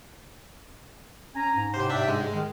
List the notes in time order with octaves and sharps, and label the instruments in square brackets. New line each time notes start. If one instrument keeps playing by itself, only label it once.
[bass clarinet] C#4 [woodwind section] G#5 A#5
[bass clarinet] G#2
[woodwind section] A2 C3 G4 [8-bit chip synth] C5
[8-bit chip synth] D4 E5
G#3
[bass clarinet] D#3